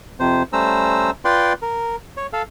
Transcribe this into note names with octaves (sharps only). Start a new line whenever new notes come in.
F2 C3 C5
G3 A3 C#4 C5 A#5 E6
F4 B4 D5 G5 C6
A#4
C#5
A4 F5